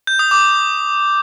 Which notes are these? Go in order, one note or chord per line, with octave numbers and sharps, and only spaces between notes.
G6
D#6
D6